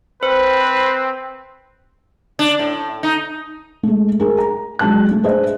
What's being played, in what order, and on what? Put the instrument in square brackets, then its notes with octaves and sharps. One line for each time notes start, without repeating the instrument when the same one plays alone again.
[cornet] C4 [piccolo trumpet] B4 [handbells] C5
[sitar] D4
A2
D#4
[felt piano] G#3 A3
G#4 A#4
A#5
F#3 G#3 A5 F#6
A3
D4 G#4 B4 C5 D#5 E5